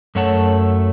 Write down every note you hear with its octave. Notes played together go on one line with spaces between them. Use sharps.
F#2 A3 C#5 F#5 A5